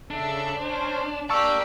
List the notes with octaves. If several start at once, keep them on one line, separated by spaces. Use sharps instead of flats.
C#3 D4 A4 E5
C#4 C5
D4 G4 A#4 D5 F5 A5 C#6 E6